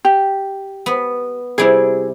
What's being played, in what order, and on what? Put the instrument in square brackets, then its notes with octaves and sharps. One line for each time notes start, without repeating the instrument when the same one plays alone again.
[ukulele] G4
[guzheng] B3
[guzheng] C3 G3 [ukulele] E4 G#4